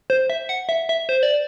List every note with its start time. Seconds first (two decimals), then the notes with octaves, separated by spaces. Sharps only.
0.10 C5
0.30 E5
0.49 F#5
0.69 E5
0.89 E5
1.09 C5
1.23 D5